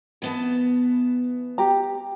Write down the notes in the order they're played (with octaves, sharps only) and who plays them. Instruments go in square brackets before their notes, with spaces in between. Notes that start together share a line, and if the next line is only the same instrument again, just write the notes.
[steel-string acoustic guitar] E3 B3 A5
[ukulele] G4 A#5